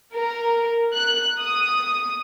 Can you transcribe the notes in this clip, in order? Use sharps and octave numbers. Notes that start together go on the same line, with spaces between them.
A#4
F#6
D#6